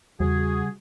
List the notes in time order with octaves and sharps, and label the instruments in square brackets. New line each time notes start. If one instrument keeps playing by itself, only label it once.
[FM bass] E2 [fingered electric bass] C#3 G3 [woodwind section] F#4 G#4